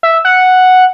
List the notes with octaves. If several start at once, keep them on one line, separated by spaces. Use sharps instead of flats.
E5
F#5